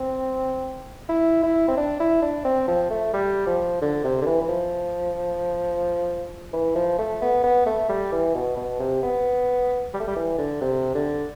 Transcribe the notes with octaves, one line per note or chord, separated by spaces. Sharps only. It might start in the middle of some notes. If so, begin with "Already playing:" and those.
Already playing: C4
E4
E4
C4
D4
E4
D4
C4
F3
A3
G3
F3
D3
C3
D3
E3
E3
F3
E3
F3
A3
B3
B3
A3
G3
E3
B2
B2
C3
B3
G3
A3
G3
E3
D3
C3
D3